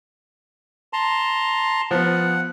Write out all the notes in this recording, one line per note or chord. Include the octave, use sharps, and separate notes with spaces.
A5 A#5 C6
F3 B3 F#5